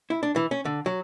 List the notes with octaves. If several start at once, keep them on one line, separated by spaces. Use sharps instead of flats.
E4
D4
E3
C#4
D3
F#3